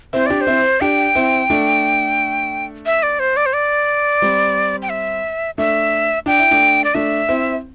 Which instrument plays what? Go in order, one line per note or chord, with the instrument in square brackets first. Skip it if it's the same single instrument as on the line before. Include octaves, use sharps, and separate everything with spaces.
[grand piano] C4 E4 [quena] C5
[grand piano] D4 G4 [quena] D5
[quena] C5
[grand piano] C4 E4
[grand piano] D4 G4 [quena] G5
[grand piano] C4 E4
A3 D4
[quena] E5
D5
C5
D5
C5
D5
[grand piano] G3 C4
[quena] G5
E5
[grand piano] A3 D4 [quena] E5
[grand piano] D4 [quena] G5
[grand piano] E4
A3 D4
[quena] D5
[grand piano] A3 D4 [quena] E5
[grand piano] C4 E4